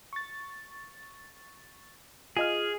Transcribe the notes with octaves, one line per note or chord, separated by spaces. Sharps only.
C#6 A6
F4 G#4 D#5 F6